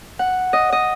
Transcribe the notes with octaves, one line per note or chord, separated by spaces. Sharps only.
F#5
D#5
D#5